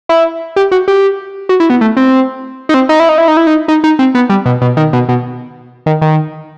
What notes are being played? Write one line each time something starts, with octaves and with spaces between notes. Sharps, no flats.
E4
G4
F#4
G4
F#4
E4
B3
A3
C4
D#4
C4
D#4
E4
D#4
E4
D#4
E4
D#4
D#4
D#4
C4
B3
G3
B2
B2
D#3
B2
B2
D#3
D#3